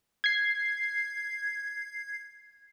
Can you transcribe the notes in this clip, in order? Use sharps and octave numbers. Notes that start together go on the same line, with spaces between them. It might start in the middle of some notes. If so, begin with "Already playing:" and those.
G#6 C7